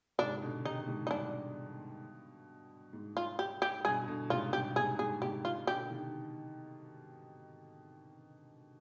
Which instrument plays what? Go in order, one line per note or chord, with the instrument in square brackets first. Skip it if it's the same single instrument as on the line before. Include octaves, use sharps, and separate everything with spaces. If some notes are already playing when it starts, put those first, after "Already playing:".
[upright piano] G#2 C3 [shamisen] D4
[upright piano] B2 D3
D3
[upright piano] C3 D#3 [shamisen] D#4
[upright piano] G#2 C3
[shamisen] D#4
[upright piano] G2 B2 [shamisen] D4
[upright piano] G#2
[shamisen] F4
G4
G4
[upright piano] G2 B2 [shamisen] G#4
[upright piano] B2 D3
[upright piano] G#2 C3 [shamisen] F4
[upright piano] G2 B2 [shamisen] G4
[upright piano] G#2 C3 [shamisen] G#4
[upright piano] G#2 C3 [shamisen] G#4
[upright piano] G#2 C3 [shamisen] G4
[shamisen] F4
[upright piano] B2 D3 [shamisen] G4
[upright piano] C3 D#3